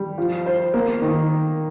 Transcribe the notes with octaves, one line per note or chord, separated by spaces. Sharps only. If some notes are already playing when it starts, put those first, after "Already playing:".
Already playing: G3
F3
C5
A#3
D#3